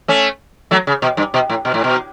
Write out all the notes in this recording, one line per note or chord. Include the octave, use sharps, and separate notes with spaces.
A3 C#4
F#3 A3
C#3
B2
G2
B2
A2
B2
A2
B2